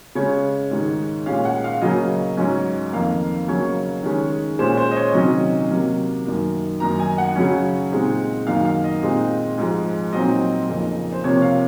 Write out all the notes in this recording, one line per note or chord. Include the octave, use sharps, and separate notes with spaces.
C#3 G#3 C#4 C#5
G#2 D#3 G#3 D#4
A#2 G#3 C#4 F5
F#5
F5
C#3 F#3 A#3 C#4 D#5
G#2 F#3 C#4
F2 D#3 A#3 F5
C#3 F#3 A#3 C#4 C#5
D#3 G#3 C#4
A#2 G#3 C#4 C5
C5
D#5
C#5
C3 D#3 F#3 C#4 D#5
C3 F#3 A#3
F#2 D#3 A#3
F#2 D#3 A#3 D#4 A#5
G#5
F#5
C#3 F#3 C#4
A#2 G#3 C4 D#4
F#2 D#3 A#3 F5
F5
D#5
A#2 G#3 C4 D#4
G#2 F3 G#3
A#2 F#3 C4 D#4 D#5
F2 C#3 F3 A#3 D#4
C5
C3 F3 A#3 C#5
F5